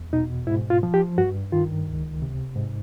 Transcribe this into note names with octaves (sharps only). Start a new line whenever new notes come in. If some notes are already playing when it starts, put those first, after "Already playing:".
Already playing: E2
B2 D#4
G#2 E4
F4
F3
G4
G2 F#4
D#3 F4
C#2
C3
G#2